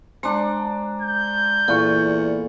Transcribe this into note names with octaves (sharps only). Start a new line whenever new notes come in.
G#3 D4 C5 A#5
G6
E2 A#2 A4 C#6